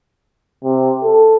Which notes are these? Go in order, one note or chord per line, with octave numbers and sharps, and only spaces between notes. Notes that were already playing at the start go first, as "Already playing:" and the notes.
C3
A4